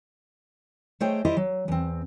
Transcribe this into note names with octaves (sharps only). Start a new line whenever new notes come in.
A3 G#4 C5 C#5 D#5 G5
E4 G4 C5 D5 D#5
F#3
E2 C4